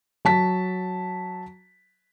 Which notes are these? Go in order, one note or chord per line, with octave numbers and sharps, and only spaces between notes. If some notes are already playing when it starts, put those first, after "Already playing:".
F#3 A5 B6